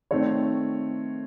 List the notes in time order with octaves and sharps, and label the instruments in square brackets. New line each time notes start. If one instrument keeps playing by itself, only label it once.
[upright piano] D#3 A3 C4 C#5